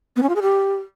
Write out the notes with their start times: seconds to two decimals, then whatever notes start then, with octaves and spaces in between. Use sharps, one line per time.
0.16 B3
0.23 C#4
0.29 F4
0.36 G#4
0.42 G4